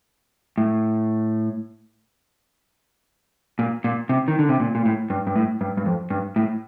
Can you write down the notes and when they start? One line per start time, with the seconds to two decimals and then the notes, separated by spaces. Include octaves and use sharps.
0.58 A2
3.59 A#2
3.84 A#2
4.09 C3
4.28 D#3
4.39 D3
4.49 C3
4.60 A#2
4.75 A#2
4.85 A2
5.10 G2
5.27 G2
5.36 A2
5.61 G2
5.77 G2
5.86 F2
6.11 G2
6.36 A2